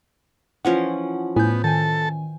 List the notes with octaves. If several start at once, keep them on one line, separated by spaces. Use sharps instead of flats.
E3 F3 C#4 F#5
A2 B3 G#5 G6
D#3 A4 G#5 A5